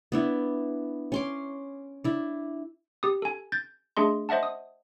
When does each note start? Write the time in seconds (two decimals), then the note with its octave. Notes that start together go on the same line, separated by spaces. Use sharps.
0.12 B3 D4 E4
1.12 C#4 C6 D6
2.04 D4 E4
3.03 G4 D#6
3.22 A4 G#5
3.52 G6 A6
3.97 A3 D4 G#4 D#5 C6
4.29 C5 D#5 E5 F#5 A5
4.43 D#6